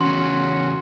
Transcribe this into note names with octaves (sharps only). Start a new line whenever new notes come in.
E2 C#3 C#4 F#4 C6